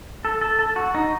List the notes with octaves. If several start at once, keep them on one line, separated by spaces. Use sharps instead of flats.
A4
A4
A4
F#4
D#4